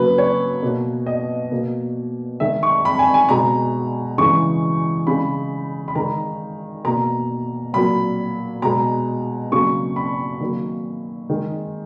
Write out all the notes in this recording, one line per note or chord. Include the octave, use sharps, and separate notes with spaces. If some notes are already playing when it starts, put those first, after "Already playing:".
Already playing: C#3 F#3 A#3 B4
C#5
B2 A#3
D#5
B2 A#3
D#3 G#3 E5
C#6
B5
G#5
G#5
B2 G#3 A#5
C#3 E3 G#3 C#6
C#3 G#3 B5
B5
D#3 G#3 A#5
B2 A#3 A#5
A#2 F#3 A#3 B5
B2 G#3 A#5
C#3 F#3 A#3 C#6
B5
D#3 F#3 A#3
D#3 G#3